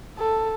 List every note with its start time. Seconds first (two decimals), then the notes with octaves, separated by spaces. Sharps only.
0.18 A4